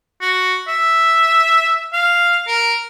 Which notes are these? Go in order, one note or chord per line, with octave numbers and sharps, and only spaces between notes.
F#4
E5
F5
A#4